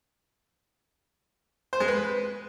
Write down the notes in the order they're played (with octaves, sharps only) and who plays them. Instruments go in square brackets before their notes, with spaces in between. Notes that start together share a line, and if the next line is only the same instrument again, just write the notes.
[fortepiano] C5
G#3
B4